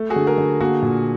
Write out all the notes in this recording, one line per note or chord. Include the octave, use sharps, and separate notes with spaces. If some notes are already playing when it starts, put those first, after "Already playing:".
Already playing: A3
F#4 G#4
D3
G#4 A#4
D3
A#3 F#4 G#4
A#2